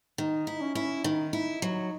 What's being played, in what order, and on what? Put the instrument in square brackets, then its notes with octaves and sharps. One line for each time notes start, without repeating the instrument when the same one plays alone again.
[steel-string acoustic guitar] D#3 [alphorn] D#4
[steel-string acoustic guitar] E4
[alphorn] C#4
[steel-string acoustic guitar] E4
[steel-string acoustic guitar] D#3 [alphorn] D#4
[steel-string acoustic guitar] E4
F#3